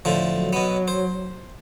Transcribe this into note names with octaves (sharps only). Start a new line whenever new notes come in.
A2 D3 F3
F#3
B2 B3
C5